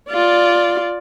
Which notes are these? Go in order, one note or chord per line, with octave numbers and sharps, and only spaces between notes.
F4 D5